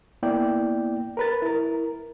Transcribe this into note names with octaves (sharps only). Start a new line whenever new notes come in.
A#3 B3 E4 D5 G5
A#4 B4 A6
E4 A#4